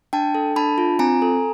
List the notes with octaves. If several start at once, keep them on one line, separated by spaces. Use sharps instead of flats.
D4 G5 A5
A4
D4 A5 B5
F4
C4 G#5 A#5
A4